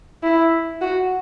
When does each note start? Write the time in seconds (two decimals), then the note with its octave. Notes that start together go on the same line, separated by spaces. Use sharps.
0.23 E4
0.81 F#4